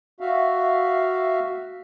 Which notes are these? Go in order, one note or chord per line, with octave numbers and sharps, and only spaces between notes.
F#4 E5 F5